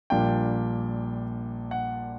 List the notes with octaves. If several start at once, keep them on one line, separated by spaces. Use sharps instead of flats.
A#1 A#2 G3 A#3 D4 G5
F#5